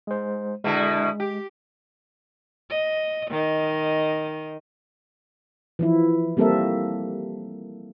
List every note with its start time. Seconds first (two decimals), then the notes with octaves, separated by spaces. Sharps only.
0.07 G#3 C5
0.64 B2 D3 G#3 E4
1.20 G4
2.70 D#5
3.30 D#3 D#5
5.79 E3 F3 E4
6.37 G3 A#3 C4 A4 A#4 E5